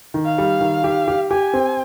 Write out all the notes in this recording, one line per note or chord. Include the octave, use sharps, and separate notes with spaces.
D#3
F5
G3
D#3
G4
G4
G4 G#5
C4